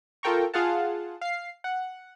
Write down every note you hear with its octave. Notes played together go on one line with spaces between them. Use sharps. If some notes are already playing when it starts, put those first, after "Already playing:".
F4 A4 A#4 G5 A#5 C#6
F4 G#4 F5 F#5 A5
F5 C7
F#5